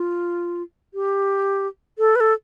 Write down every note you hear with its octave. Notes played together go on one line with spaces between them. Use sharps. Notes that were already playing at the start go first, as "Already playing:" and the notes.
Already playing: F4
G4
A4
B4
A4